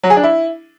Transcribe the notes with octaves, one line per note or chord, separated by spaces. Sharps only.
F#3
G#4
D4
E4